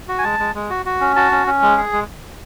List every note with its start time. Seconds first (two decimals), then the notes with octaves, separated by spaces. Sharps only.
0.09 F#4
0.19 G#5
0.24 G#3 A5
0.39 G#3
0.55 G#3
0.70 F#4
0.86 F#4
1.01 C#4
1.16 F#4 A5
1.32 C#4
1.47 C#4
1.62 G#3
1.77 G#4
1.93 G#3